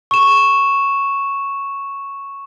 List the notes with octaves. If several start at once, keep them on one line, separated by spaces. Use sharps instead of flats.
C#6 E7